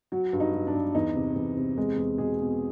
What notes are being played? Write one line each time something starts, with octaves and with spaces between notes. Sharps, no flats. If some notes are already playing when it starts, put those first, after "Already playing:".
F#3 F#4
G2
D#4
F#3
D4
G2
E2 D#4
C3
E2
C3
E2 G#3 G#4
E2
B2 G#3 G#4
B2